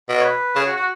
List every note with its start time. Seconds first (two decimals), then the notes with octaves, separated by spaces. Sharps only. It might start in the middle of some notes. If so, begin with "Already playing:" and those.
0.09 B2
0.20 C#5
0.24 B4
0.55 C#3 G#4
0.66 F#4
0.76 F#4